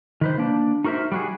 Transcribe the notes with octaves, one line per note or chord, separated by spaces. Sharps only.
D#3 B4 C5
A#3 D4
D#4 F#4 A#4 C5 E5
G3 F#4 G#4